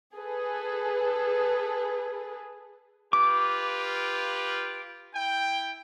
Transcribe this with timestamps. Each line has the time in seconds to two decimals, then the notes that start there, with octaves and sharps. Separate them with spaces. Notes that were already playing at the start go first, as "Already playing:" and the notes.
0.16 G#4 A4 B4
3.13 F4 G4 B4 D6
5.14 E4 G5